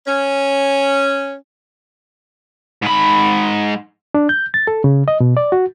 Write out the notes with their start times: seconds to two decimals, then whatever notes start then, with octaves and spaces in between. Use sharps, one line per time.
0.06 C#4
2.82 G#2 B5
4.15 D4
4.29 G6
4.54 A6
4.67 A4
4.84 C#3
5.08 D#5
5.20 B2
5.37 D5
5.52 F#4